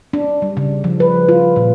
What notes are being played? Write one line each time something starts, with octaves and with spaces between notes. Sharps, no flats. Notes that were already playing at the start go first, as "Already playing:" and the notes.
D4
G3
C#3
F3
B4
F4
A#2